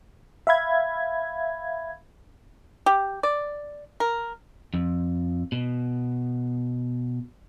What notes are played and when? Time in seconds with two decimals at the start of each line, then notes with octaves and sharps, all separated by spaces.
0.47 E5 F5 B5 G#6
2.86 G4
3.23 D5
4.00 A#4
4.74 F2
5.52 B2